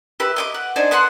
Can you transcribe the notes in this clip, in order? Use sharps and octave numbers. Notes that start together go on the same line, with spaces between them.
G4 B4 E5
D#5 G5 D6
F#5
D4 D#4 C5 G#5
B3 F#5 A5 C6